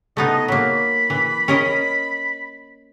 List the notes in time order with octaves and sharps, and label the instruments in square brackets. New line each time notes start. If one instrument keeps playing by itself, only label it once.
[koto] A3 B3 D#4 [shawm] D#5
[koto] F#3 A#3 [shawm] B5
[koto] E3
C#4 A#4 D#5